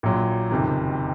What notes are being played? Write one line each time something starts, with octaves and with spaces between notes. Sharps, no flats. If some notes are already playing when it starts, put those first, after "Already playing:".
A#1 A#2 F#3
F#1 F2 C3 D#3